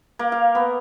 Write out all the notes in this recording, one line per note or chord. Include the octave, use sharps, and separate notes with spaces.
A#3
F5
B3